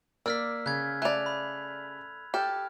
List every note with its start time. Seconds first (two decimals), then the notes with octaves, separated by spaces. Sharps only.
0.26 A#3 D5 E6 F6 B6
0.66 C#3 F#6 G#6
1.02 A3 D5 F#6 F7
1.26 B5
2.34 G4 A4 F6